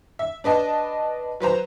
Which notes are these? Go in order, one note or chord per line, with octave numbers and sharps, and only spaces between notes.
E5
D4 B4 D#5 A5
F#3 B4 C5 A#5